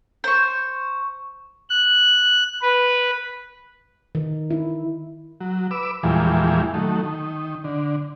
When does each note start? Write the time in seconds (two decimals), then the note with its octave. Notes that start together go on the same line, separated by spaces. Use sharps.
0.24 C5 C#6
1.70 F#6
2.62 B4
4.15 D#3
4.51 E4
5.40 F#3
5.71 B4 D6 E6
6.03 E2 A#2 E3 F3 G3 G#3
6.74 D#3 F#3 A3
7.04 D#3
7.64 D3